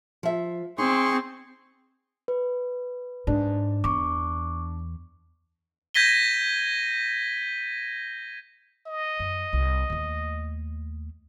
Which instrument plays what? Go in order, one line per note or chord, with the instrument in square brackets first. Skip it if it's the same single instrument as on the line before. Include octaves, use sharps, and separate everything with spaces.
[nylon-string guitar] F3 E5
[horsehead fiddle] C4 [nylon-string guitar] D#4 [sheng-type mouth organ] G#4 C6 C#6
[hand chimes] B4
[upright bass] G#2 [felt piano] D4
[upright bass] E2 [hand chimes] C#6 D6
[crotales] G6 G#6 A#6 B6 D#7 G7
[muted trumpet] D#5
[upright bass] F#2
C2
D#2 A3